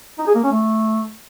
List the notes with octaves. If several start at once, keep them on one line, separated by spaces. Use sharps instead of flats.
D#4
G#4
A#3
C#4
A3